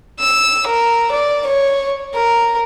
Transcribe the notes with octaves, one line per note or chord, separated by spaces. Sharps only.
E6
A#4
D5
C#5
A#4